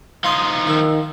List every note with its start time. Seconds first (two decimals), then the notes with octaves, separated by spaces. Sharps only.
0.24 F3 D#4 F5 C6 D#6
0.67 D#3 F5 E6